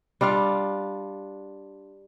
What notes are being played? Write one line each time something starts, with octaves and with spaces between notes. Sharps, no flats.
G3 D4 F4 F5